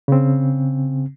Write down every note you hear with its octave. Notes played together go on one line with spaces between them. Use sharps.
C#3 C4